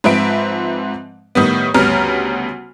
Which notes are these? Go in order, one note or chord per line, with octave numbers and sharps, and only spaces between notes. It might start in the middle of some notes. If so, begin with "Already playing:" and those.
G#2 F3 C4 B4 E5 D7
A2 D#3 G3 B3
D2 C#3 G3 B3 A#5 F6